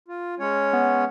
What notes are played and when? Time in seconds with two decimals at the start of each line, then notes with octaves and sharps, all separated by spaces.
0.08 F4
0.39 G#3 C#4 C#5
0.73 B3